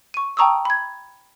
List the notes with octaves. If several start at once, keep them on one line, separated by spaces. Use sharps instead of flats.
C#6 D#7
G5 A5 A#5 C#6 D#6 E6
B5 G#6